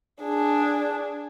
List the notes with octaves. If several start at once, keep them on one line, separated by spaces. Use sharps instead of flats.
D4 G#4